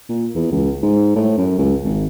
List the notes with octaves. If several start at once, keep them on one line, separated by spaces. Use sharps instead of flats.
A#2
E2
C#2
G#2
A2
F#2
C#2
G#1